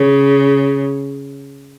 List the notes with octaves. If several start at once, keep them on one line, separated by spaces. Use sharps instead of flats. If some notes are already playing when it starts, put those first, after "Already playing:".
Already playing: C#3